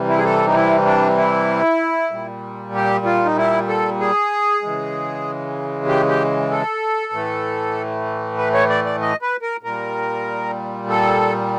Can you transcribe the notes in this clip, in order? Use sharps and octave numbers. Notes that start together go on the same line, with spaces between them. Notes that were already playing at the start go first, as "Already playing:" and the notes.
Already playing: C3 E3 G3
E4
G#4
A4
D#4
E4
D4
E4
A#2 G3
G4
F4
D#4
E4
A4
G#4
C#3 E3 G#3
G4
G4
A4
A2 E3 A3
B4
C#5
D5
D5
D#5
B4
A#4
A#2 G3 A#4
A4